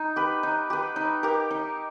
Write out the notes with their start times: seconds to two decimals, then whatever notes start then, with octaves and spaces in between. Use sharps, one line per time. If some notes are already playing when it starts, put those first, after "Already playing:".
Already playing: D#4
0.16 G4 B4
0.43 D#4
0.70 G4 B4
0.96 D#4
1.23 G4 A#4
1.51 D#4